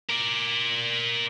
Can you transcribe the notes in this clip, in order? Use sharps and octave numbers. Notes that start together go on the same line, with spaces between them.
A#4 D5